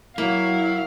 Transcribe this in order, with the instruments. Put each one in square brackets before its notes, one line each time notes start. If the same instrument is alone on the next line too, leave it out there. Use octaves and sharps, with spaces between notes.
[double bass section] F#3 [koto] A#3 [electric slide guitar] E4 [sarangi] F5